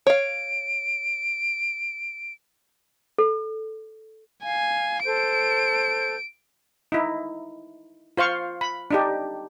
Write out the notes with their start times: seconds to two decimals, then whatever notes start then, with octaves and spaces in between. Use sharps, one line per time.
0.07 C#5 F5 D7
3.18 A4
4.44 F5 G#5
5.05 A4 C5 G6 D7
6.92 D#4 E4
8.17 F4 C5 F5 C#6
8.61 B5
8.91 D4 D#4 G4